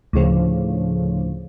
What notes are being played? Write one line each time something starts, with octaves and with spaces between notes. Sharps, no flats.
D2 A2 C#3 F3